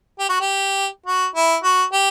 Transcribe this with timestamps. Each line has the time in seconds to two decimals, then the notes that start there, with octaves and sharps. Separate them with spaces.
0.19 G4
0.29 F#4
0.41 G4
1.06 F#4
1.35 E4
1.63 F#4
1.93 G4